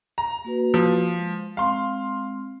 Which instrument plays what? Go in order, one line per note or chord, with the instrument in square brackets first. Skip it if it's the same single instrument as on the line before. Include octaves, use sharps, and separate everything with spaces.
[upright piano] A#5
[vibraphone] A#3 F#4 B4
[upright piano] F3
[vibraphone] G#3
[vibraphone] G#3 C4 [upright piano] F5 C6